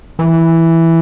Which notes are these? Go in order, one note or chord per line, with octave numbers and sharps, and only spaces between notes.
E3